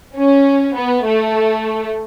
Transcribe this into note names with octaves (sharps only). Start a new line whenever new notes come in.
C#4
B3
A3